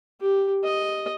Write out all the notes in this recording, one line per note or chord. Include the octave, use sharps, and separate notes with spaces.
G4
D#5